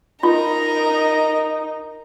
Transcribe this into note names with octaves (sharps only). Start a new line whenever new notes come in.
D#4 F4 A#4 D#5 A#5